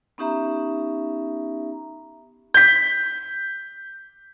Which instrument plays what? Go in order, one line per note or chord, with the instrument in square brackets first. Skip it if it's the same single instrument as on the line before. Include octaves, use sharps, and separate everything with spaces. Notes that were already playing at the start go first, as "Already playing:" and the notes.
[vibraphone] B3 C#4 D#4 G4 E5 A#5
[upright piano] G6 B6